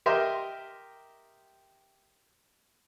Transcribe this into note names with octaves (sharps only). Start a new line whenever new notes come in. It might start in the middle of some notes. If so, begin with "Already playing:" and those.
G4 A#4 D#5 E5 G5 C6